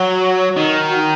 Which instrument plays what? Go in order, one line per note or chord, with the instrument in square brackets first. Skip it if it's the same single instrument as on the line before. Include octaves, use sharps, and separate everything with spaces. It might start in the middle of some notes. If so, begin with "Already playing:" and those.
Already playing: [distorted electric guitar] F#3 [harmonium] F#4
[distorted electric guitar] D#3 [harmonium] D#4
[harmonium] F#4